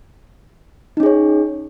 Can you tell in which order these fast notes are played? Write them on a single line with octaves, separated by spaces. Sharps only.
D#4 C#4 G#4 C#5